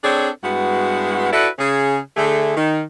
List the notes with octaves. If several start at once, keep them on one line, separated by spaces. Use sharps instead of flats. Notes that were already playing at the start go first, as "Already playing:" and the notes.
C4 D4 G#4 A4 C#5 D5
G2 G#3 B3 E4 F#4
E4 F#4 A4 B4 D5 E5
C#3 G#4
D3 A3 G#4
D#3